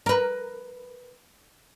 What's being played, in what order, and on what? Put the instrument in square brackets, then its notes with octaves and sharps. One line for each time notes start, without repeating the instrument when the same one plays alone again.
[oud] A#4 B4